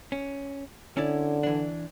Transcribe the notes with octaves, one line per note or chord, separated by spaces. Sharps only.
C#4
D3 C#4 E4 D5
E3 D4